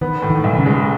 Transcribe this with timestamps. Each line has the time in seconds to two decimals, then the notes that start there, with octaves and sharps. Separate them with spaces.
0.01 D#3 B3
0.22 A2
0.30 D#3
0.44 B1
0.58 C#3
0.66 G#3